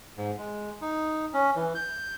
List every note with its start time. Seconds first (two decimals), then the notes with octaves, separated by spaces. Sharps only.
0.18 G#2
0.38 G#3
0.82 D#4
1.34 C#4
1.56 E3
1.75 G6